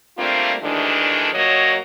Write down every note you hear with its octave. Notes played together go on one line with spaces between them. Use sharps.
G3 A3 A#3 C4 D4 F4
D2 D#3 E3 G#3 D4
A#2 F#3 A#3 F#4 C#5 D#5